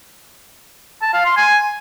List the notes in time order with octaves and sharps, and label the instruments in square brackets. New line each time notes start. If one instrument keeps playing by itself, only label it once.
[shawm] A5
F5
C6
G#5